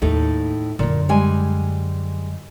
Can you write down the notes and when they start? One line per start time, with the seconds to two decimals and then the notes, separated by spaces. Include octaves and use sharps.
0.02 D#2 A2 D#4 A4
0.79 F#2 A#2 D3
1.09 G3 G#3 G#5